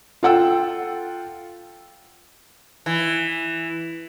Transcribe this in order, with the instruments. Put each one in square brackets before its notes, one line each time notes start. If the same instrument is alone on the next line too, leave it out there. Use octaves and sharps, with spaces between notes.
[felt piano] F4 A4 F#5 G5 E6
[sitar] E3